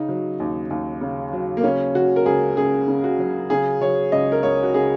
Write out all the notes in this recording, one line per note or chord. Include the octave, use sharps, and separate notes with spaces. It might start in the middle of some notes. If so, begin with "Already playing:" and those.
Already playing: C#3 D#4
F#3
D#2
D#2
C#3
F#3
A#3
C#3 C#4
F#3 F#4
A#4
C#2 G#4
C#2 G#4
C#3
F#4
F#3
C#3 G#4
F#3 C#5
C#2 D#5
A#4
C#2 C#5
F#4
C#3 G#4